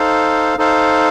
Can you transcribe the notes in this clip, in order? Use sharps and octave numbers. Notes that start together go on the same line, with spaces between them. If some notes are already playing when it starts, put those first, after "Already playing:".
Already playing: D#4 A4 C5 F5
D#4 A4 C5 F5